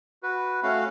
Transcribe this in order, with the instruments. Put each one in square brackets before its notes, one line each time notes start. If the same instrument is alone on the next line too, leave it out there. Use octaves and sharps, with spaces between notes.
[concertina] F#4 B4
A3 C#4 F#4 F5